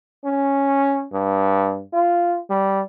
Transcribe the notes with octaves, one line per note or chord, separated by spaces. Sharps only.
C#4
G2
F4
G3